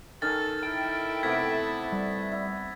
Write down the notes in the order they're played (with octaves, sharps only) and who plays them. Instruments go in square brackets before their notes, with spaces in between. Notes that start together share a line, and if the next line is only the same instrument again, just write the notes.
[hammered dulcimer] D#3 C#4 [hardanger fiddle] A4 [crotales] A6
[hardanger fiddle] E4 A4 [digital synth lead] G5
[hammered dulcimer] C3 A3 B3 [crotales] G#6 B6
[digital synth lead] G3
[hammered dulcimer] E4